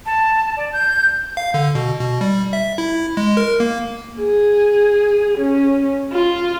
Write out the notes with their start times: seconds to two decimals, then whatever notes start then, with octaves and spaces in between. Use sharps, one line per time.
0.06 A5
0.57 D5
0.73 G6
1.37 F5
1.54 D3
1.75 B2
2.00 B2
2.21 G3
2.53 E5
2.78 E4
3.17 G#3
3.37 A#4
3.60 A#3
4.19 G#4
5.38 C#4
6.12 F4